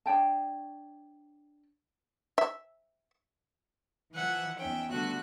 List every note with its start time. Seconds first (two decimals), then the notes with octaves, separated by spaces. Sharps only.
0.06 D4 C#5 G5 A5
2.38 E5
4.14 E3 F3 E5 F#5 G#5
4.59 E2 C#4 D#4 E5 G5
4.90 D3 G3 A3 B3 F#4 F#6